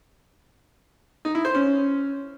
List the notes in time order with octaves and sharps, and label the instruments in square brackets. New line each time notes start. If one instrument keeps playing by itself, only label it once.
[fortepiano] D#4
E4
C5
C#4